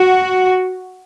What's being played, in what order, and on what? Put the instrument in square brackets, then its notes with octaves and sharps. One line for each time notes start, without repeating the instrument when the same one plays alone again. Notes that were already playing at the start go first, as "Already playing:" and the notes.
Already playing: [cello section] F#4